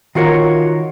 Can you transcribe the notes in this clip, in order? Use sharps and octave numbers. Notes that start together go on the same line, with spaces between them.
D#3 F4 F#4 A#4 C#5